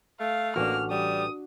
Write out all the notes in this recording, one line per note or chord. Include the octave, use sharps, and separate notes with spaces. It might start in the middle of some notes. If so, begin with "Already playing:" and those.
A3 F5
A1 A#3 D4 F#4 F6
G3 D#6